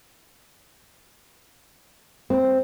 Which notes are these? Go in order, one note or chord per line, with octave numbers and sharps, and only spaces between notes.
C4